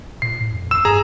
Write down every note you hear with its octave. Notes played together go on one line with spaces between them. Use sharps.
A#2 C7
A2
F2
E6 E7
G2 G#4 A#5